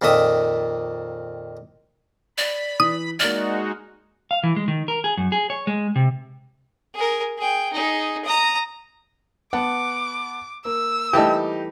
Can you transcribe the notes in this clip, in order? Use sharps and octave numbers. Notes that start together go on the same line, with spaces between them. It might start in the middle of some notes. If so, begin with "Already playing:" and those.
F2 A#2 D#3 E5 D#6
D5 B5
E3 D#6
G#3 A#3 D#4 F#4 D5 F6
F5
E3
G#3
D#3
A#4
G#4
F#2
G#4
C#5
G#3
C3
G#4 A#4
G#4 G5
D#4 G#4
A#5 D#6
B3 F#5 A5 D6
A#3 E6
E3 G3 A3 D#4 G4